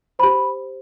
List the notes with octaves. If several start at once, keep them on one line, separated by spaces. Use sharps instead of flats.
G4 C5 B5